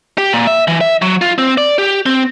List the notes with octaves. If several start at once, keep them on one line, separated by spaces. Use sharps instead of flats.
G4
A#2
E5
E3
E5
F#3
F4
C4
D5
G4
C4